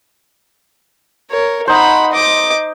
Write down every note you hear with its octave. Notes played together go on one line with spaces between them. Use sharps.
A#4 C#5
D#4 C5 F#5 B5
D#5 D6